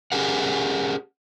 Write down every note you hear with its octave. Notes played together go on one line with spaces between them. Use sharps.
C#4 G4 G#4 A#4 F#5